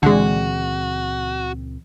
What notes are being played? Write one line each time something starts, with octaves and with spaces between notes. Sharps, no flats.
C#2 A#2 D3 E3 G#3 C4 F#4 G#4